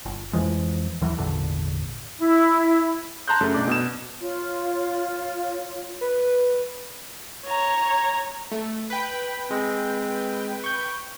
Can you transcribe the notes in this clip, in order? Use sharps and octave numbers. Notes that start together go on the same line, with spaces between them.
G1
F2 E3 F3 G#3
D#2 E3 F#3
G#1 E2 A#2 D3
E4
A5 A#5 C6 F#6 G6
F#2 C#3 A3
B1 D4 D6
B2 E7
F4 C#5
B4
C#5 A#5
A3
B4 G5 B5
G#3 C4
C#6 G6